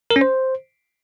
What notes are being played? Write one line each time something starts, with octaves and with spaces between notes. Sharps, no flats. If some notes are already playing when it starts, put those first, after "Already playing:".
A#4
C#4
C5